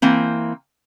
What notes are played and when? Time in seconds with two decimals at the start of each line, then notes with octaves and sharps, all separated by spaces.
0.02 E3 A#3 C4